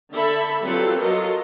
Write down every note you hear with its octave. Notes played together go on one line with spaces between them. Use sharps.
D3 A4 E5 B5
F#3 G3 C4 F4 A4 B4
F#3 F4 A4 A#4 D#5